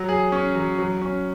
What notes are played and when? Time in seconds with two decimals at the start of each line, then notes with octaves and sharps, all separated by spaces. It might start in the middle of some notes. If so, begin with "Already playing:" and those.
Already playing: F#3
0.09 G#4
0.32 C#4
0.55 F#3
0.79 F#3
1.01 C#4